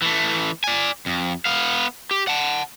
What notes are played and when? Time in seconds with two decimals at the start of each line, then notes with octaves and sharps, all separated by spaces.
0.02 E3 A3
0.64 D5 G#5
1.06 F2
1.45 B3 F5
2.11 G4
2.28 F#5 A5